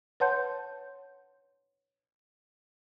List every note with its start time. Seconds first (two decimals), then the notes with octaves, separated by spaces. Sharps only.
0.20 B4 C#5 F#5 A5 C6 G6